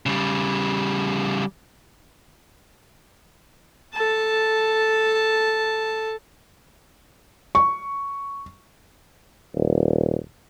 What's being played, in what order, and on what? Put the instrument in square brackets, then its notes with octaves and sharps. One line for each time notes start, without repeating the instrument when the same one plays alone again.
[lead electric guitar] C#3 G3
[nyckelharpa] A4 A5
[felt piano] C#6
[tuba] D#1